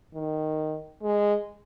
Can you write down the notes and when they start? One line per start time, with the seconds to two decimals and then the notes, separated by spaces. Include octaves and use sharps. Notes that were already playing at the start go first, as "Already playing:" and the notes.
0.14 D#3
1.03 G#3